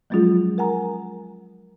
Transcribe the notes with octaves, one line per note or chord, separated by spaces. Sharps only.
F3 F#3 G#3 C#4 F4 G#4
A#4 F#5 G#5 A#5